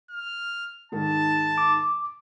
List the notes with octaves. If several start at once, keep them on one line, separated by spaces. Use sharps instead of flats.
F6
G#2 D#3 A5
D6